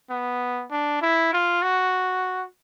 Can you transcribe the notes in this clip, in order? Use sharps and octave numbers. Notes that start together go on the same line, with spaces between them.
B3
D4
E4
F4
F#4